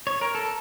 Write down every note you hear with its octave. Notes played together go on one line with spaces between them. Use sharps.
C#5
A#4
A4